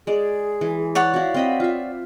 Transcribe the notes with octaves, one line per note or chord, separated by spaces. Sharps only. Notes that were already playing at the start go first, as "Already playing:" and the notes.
G#3 G#4 D5
E3
C#5 D5 F#5
E4 F#4 F5
C4 D#5 B5
F4 E5